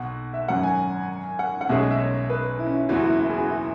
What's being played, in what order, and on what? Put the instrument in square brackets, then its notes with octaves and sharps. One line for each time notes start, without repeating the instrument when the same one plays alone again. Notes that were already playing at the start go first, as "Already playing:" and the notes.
Already playing: [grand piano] B1 B2 [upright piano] F#5
[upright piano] E5
[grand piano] G#1 F#2 F#3 C#4 [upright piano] F#5
[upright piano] G#5
F#5
F#5
[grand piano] B1 B2 G#3 C#4 G#4 [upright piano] E5
[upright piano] E5
C#5
B4
E4
C#4
E4
[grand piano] F#1 E2 E3 [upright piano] F#4
[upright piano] F#4
E4
E4
G#4
F#4
E4